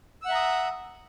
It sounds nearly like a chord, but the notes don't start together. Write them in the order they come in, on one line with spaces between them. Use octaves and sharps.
E6 F#5 E5 A#5 D#6